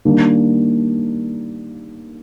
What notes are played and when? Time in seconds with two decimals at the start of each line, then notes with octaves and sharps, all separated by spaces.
0.05 D#3 G3 A#3 D4